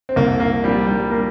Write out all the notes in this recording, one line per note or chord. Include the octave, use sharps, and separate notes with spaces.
C4
C2 A#3
A#3
A#2 F3 G3
G3
A#3